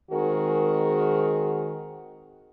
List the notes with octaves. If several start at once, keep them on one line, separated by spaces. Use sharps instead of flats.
D#3 G#3 C4 F#4 G#4 A#4